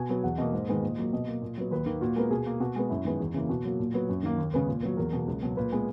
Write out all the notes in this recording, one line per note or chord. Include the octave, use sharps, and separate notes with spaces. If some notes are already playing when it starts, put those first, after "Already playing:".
Already playing: B2 G#5
F#3 B3
E2 F#5
B2 A#3 D#5
G#2
D#3 G#3 B3
A#2
F#3 A#3
B2 D#5
A#3
A#2
F#3 B3
D#2 B4
D#3 A#3
A#2 F#4
G#3 B3 A#4
B2 G#4
A#3
B2 F#4
G#3 B3
F#2 E4
D#3 G#3 B3
E2
C#3 E3 A#3
B2 F#4
F#3 A#3
A#2
F#3 B3
F#2
D#3 A#3
D#2
C#3 G#3 B3
A#2
F#3 B3
E2 A#4
B2 A#3
C#2
B2 F#3
A#2 B4
G#3 B3